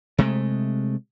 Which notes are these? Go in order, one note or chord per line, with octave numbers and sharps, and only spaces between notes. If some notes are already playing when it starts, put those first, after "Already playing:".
C3 G#3 A3